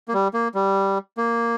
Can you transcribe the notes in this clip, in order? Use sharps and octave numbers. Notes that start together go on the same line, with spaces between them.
A#3
G3
A#3
G3
A#3